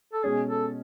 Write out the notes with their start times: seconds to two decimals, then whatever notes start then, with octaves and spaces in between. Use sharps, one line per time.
0.13 A4
0.23 B2 G#3 C#4 G#4
0.48 A4